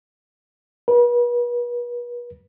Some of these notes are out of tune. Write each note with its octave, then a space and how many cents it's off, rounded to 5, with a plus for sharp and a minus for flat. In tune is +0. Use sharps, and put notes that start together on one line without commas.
B4 -40